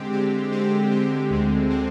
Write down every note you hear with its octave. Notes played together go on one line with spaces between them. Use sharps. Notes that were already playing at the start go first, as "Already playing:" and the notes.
Already playing: D3 G#3 C4 G4
D3 G#3 C4 G4
D3 G#3 C4 G4
D3 G#3 C4 G4
D2 D3 G#3 C4
D3 G#3 C4